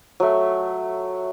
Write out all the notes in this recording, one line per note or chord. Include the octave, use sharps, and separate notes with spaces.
F#3 A3